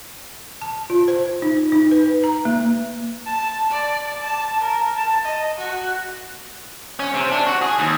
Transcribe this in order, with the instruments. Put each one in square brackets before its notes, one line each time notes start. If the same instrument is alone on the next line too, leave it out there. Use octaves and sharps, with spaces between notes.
[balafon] A5
F4
C5
D#4
D#4
B4
A#5
A#3
[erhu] A5
D5
A5
A#4
A5
D#5
F#4
[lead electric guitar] C#4
C3
D4
F#4
G#4
D#2